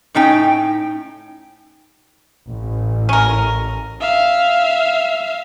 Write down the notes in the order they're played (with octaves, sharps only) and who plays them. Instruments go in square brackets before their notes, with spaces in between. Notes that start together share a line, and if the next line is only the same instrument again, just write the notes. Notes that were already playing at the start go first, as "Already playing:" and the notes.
[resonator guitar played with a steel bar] A2 C#4 D#4 G5
[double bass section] A1
[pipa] C#4 A#4
[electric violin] E5 F5